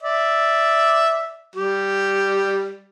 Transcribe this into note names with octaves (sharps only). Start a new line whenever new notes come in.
D5 E5
G3 G4